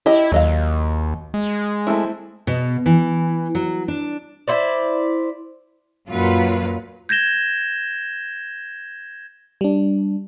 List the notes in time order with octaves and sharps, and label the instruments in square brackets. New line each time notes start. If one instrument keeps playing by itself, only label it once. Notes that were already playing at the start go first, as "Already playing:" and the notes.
[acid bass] E4 [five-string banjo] G4 D#5
[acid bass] D#2 [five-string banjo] F#3 D#5 F5
[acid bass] G#3
[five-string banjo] A3 C4 E4
[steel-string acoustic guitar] B2
E3
F#3
D4
[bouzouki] E4 C5 D5
[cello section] F#2 A#2 F#3 F4 B4
[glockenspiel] G6 G#6 A#6 E7 G7
[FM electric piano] G3 D4